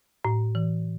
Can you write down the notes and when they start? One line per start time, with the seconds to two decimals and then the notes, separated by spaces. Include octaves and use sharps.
0.25 A2
0.55 E3